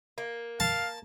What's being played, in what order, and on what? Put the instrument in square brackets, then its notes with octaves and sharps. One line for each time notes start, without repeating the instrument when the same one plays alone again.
[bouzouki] A#3
[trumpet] F5 [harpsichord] A5